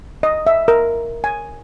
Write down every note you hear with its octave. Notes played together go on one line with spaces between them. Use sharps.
D#5
E5
A#4
G#5